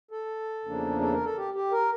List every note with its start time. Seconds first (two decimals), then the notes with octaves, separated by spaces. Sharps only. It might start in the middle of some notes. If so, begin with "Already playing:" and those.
0.11 A4
0.65 E2 C#3 F3 A#3 D4
1.01 A4
1.12 A#4
1.24 A4
1.37 G4
1.54 G4
1.72 A#4